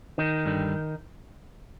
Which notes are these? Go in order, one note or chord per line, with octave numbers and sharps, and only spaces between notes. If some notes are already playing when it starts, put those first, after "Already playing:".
D#3 D#4
G2 D3 G3